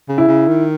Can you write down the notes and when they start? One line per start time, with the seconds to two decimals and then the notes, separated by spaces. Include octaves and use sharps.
0.08 C#3
0.18 E4
0.28 C#3
0.48 D#3